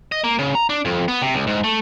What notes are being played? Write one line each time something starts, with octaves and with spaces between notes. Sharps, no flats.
D#5
A#3
C#3
A#5
D4
F2
B3
C3
C#2
G#2
A3